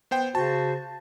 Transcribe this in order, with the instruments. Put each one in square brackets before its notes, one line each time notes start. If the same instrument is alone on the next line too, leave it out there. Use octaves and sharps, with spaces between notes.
[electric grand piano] B3 C5 G5
[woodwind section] C#3 F#4 C5 [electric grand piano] A5